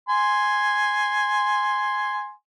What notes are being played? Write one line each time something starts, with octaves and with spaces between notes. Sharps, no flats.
G#5 C6